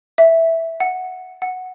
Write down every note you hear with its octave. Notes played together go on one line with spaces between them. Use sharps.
E5
F#5
F#5